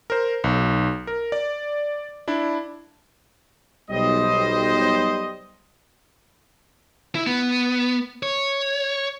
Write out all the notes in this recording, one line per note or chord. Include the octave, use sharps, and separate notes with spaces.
A#4 C5
B1
A#4
D5
D4 E4
B1 G3 C5 D#5
E4
B3
C#5